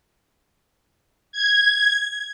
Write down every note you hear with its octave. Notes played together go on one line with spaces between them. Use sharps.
G#6